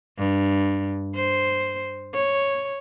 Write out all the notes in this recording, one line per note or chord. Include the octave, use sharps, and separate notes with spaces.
G2
C5
C#5